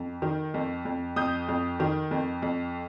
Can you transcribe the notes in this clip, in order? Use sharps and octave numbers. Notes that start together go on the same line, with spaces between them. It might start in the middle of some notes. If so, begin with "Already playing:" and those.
Already playing: F2
D#3
F2
F2
F2 D#6 G6
F2
D#3
F2
F2